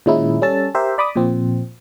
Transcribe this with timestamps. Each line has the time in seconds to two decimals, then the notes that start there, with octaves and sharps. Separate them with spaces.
0.06 A#2 D#3 G#3 C#4 D#4 E4
0.42 G3 C#4 A4 A5
0.75 G4 A#4 C5 E5
0.98 D5 B5 D6 D#6
1.16 A#2 F3 C4